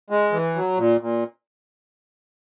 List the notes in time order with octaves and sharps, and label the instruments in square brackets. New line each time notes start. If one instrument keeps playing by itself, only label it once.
[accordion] G#3
E3
F#3
A#2
A#2